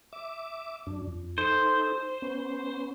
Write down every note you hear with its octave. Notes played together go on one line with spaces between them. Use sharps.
E5 D6
F#2 D4
F2
D#4 A4 C5
B3 C#4